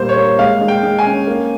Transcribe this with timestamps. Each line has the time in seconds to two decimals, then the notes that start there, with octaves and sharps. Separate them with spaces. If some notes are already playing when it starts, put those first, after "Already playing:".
Already playing: A#2 G3 A#3 C5
0.09 C#5
0.16 A#3
0.39 G#3 F5
0.61 G#3
0.68 G5
0.83 G#3
0.99 G#5
1.06 C#4
1.27 A#3